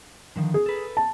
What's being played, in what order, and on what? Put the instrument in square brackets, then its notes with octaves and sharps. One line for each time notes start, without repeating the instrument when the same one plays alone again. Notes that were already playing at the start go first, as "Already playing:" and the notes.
[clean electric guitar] D3 D#3 F3
[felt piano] G#4
[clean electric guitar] A4 B4
[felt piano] A5